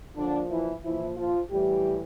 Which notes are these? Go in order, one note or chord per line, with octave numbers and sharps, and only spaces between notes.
A#2 D3 F3 D4
E3 E4
A#2 E3 F3 E4
F3 F4
A2 E3 G3 G4